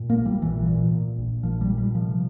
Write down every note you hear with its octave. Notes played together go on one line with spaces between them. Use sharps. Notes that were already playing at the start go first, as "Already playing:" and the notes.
Already playing: A#2
A#3
A#1
G3
A#2 E3
A#2
A#2
A#1
A#2 F3
G3
A#2
G3
C3 F3